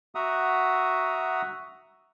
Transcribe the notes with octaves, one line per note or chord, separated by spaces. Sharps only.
F#4 E5 F#5 A#5 D#6